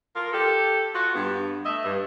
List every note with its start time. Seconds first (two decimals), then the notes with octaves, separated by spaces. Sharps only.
0.15 F4 A#4
0.33 G4 A4
0.94 F4 F#4
1.15 G2 B3
1.65 A3 D#5 E5
1.84 G2